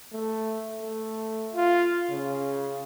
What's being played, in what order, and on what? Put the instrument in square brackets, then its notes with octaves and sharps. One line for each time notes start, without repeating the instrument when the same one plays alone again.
[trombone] A3
A3
F4
C#3